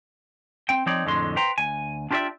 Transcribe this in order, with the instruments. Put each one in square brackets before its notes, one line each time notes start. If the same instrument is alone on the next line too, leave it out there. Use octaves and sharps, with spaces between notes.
[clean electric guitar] C4 G5
F3 C4 D#4 C#5 D5
F2 A2 D3 G#3 C6
B4 C5 G5 A#5 C6
D2 G#5
D4 F4 G4 B4 D5 E5